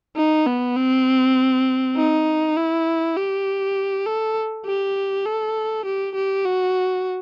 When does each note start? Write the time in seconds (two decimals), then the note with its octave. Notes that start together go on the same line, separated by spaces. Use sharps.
0.16 D#4
0.46 B3
0.76 C4
1.97 D#4
2.56 E4
3.16 G4
4.06 A4
4.66 G4
5.26 A4
5.85 G4
6.15 G4
6.45 F#4